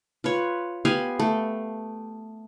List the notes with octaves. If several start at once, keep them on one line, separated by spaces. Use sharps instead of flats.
F4 B4 C#5
B3 G4 F5 G#5
A3